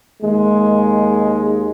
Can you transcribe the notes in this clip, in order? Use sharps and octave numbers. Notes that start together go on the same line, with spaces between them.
D#2 G#3